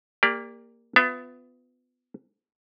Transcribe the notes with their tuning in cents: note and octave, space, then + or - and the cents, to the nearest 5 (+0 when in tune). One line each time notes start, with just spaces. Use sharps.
A#3 +0 G4 +30 D5 +0
B3 +25 F4 +0 E5 +35